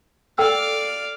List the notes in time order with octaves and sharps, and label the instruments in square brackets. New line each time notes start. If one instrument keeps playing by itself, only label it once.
[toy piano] A4 G5 E6 [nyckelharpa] D5 F5